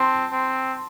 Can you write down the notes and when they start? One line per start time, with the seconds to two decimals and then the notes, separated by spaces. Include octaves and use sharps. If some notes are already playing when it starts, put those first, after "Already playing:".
Already playing: C4 A5 C6
0.32 C4